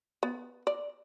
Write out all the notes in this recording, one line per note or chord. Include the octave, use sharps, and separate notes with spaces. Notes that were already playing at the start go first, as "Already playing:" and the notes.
B3
D5